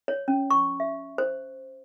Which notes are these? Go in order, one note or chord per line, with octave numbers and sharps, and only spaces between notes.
C#5
C#4
C#6
E5
C5